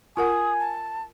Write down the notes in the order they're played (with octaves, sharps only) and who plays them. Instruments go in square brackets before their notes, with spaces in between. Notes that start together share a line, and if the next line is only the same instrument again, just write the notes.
[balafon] F4 A#4 F#5 [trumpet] G#5 [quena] D#6
[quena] A5